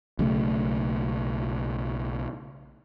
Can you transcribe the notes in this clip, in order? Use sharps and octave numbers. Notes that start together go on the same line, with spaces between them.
B1 C#3 A3